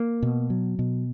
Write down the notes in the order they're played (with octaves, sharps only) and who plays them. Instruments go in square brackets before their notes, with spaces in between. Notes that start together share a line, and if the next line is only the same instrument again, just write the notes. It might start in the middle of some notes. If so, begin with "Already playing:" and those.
Already playing: [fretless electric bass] A#3
B2
F#3
B2